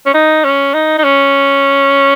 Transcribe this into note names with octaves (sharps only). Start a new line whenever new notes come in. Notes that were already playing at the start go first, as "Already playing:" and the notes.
C#4
D#4
C#4
D#4
D#4
C#4